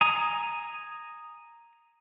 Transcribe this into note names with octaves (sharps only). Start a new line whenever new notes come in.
G#5 A#5 D#6